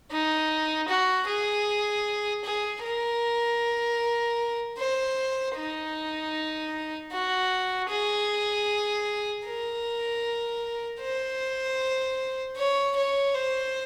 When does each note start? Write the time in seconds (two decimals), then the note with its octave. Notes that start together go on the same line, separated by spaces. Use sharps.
0.11 D#4
0.88 F#4
1.28 G#4
2.44 G#4
2.83 A#4
4.78 C5
5.56 D#4
7.12 F#4
7.89 G#4
9.46 A#4
11.01 C5
12.57 C#5
12.96 C#5
13.35 C5